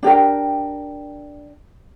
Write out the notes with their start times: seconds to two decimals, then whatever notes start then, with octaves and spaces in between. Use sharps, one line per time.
0.03 D4 G4 A#4 G5